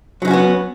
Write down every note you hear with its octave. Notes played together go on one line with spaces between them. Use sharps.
F#3 B3 C#4 D#4 F#4